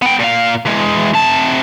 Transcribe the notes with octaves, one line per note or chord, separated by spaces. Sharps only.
B3 G5
A#2 F5
E3 G#3
C3 A5